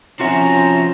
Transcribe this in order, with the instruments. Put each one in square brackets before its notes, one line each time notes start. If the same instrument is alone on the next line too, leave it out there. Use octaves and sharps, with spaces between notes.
[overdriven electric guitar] C3 F3 [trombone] C#4 [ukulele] F4 F#4 E5 [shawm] A#5